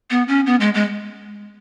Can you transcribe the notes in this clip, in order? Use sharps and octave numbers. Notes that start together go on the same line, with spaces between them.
B3
C#4
B3
G#3
G#3